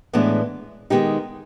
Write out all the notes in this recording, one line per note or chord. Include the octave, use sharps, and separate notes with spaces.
A2 E3 G#3 B3 D4
D#3 G#3 B3 D#4 G4